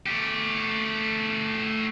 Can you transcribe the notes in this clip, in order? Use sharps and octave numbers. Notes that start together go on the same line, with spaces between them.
A3 G4